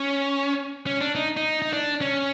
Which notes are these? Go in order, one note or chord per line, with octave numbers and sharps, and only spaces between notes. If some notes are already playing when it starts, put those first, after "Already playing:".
Already playing: C#4
C#4
D4
D#4
D#4
D#4
D4
C#4